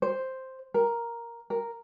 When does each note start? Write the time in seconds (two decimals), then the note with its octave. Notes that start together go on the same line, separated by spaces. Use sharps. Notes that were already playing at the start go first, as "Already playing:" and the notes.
0.02 C5
0.74 A#4
1.50 A#4